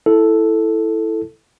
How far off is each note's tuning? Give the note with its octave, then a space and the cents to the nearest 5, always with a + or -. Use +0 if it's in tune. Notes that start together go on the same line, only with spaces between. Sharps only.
E4 +0 A4 +0